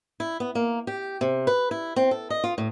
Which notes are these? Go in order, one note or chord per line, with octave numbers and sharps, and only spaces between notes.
E4
B3
A#3
G4
C3
B4
E4
C4
A4
D#5
F4
A2